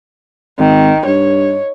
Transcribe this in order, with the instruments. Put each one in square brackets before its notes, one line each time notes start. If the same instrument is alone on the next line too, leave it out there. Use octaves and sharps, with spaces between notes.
[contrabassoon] G#1 [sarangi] D#3
[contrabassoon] G2 [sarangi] C#5